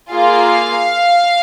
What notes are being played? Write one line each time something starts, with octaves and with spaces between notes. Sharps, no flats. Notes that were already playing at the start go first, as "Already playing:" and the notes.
A#3 F4 G#4 F5